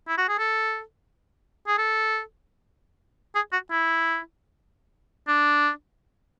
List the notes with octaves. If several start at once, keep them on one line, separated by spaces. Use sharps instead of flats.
E4
F#4
G#4
A4
G#4
A4
G#4
F#4
E4
D4